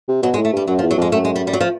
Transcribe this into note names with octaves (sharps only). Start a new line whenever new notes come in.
C3
B2 F#3
G#3
A2
A3
G2 G3
F#2 F#3
F3
E2
F#3
F2 G#3
F#2 A3
G#3
G3
G3
F#3
F3